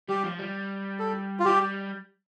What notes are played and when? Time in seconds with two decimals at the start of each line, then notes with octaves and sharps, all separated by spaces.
0.09 G3 G4
0.24 F3
0.39 G3
0.99 A4
1.40 F4
1.45 G3 G4